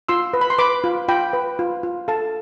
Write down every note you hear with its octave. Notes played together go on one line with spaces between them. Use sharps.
F4 C6 E6
B4
B5
C6
B4 B5 D6
F4
F4 G5 B5
B4
F4
F4
A4 F5 A5